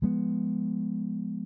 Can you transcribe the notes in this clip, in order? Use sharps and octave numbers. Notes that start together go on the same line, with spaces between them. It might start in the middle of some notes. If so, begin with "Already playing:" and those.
F3 G#3 B3